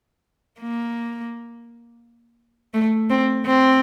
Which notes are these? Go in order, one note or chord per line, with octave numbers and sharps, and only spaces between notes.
A#3
A3
C4
C4